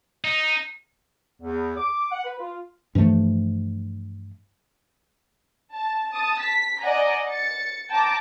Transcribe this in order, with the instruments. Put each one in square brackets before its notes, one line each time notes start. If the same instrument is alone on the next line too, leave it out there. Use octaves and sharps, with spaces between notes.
[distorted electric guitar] D#4
[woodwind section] E2
D6
F#5
B4
F4
[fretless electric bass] G2 E3 F3 A3
[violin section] A5
A5 D#6
B6
D5 D#5 F#5 G#5 A#5
A6 C#7
G5 A5 A#5 D6